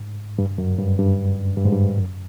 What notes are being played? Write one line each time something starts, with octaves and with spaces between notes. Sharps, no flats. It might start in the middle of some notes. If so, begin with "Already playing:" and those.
Already playing: G#2
G2
F#2
G2
G2
G2
G#2
G2
F#2